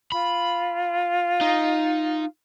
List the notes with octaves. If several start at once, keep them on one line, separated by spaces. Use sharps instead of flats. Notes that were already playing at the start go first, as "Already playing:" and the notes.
F4 B5
D#4